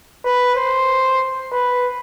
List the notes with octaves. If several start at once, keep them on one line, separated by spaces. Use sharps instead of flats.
B4
C5
B4